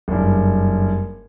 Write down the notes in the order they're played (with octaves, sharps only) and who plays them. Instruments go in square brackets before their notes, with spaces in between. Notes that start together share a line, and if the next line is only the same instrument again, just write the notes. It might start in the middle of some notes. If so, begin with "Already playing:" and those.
[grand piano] F#1 G2